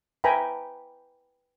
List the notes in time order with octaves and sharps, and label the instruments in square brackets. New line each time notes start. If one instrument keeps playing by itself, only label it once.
[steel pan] B4 E5 G5 G#5 A#5 B5